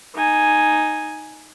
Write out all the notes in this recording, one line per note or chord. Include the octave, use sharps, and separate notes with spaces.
D#4 G#5